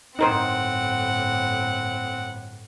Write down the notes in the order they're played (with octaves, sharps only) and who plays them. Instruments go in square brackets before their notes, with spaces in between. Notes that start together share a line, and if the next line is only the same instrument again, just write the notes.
[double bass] G1 A2 [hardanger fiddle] C4 F#5 [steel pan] D#4 A#4 C5